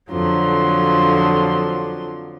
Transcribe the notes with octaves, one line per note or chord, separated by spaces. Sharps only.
F2 D3 F3 F#3 C6